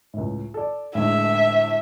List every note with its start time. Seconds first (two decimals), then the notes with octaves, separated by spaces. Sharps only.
0.14 C#2 A2
0.54 A4 D5
0.95 A2 D3 G#3 E5